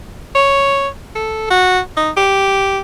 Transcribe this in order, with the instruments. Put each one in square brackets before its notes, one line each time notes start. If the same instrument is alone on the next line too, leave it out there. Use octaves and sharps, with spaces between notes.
[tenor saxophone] C#5
A4
F#4
D#4
G4